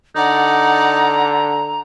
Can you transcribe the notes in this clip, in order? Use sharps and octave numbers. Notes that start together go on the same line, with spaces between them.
D3 D#4 D5 F#5 A#5